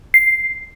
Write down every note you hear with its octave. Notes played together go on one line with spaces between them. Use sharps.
C7